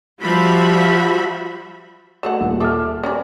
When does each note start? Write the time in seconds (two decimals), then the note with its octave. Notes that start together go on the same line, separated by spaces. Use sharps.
0.21 F3 G3 F#4 E5 B5
2.23 F#3 A3 F#5 E7
2.41 D#1 F4
2.60 G#4 A4 E5 D6 F6
3.04 C#4 A#4 D5